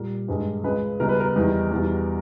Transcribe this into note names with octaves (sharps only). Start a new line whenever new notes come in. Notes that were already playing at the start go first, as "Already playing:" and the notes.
Already playing: A#2 G3 A#4
G2 D#3 G#3
C#2 C#3 G#3 B4
C#2 B2 G3 A#4
B4
A#4
E2 D#3 G3
E2 B2 G3